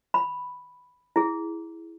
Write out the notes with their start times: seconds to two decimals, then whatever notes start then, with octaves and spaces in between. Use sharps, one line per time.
0.14 B5
1.16 E4 G#4